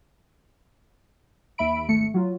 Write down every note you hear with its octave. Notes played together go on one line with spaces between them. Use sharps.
D#2 E5 B5 D7
G#1 A3 C#7
F#3 F4